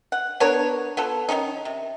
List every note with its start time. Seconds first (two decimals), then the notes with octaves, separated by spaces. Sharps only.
0.12 F#5
0.40 B3 D4 A#4 C#5
0.97 B3 F4 A4
1.29 D#3 C4 C#4 D#4
1.65 C3